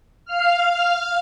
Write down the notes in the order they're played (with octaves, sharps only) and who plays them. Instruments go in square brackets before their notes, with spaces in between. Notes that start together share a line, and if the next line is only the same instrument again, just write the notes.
[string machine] F5 F6